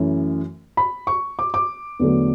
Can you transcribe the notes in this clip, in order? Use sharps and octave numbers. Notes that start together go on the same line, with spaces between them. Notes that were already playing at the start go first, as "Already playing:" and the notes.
Already playing: F#2 E3 A3 C#4
B5
C#6
D6
D6
E2 D3 F#3 A3